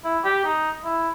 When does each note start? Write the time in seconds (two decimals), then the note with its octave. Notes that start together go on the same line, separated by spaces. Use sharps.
0.05 E4
0.25 G4
0.45 D#4
0.85 E4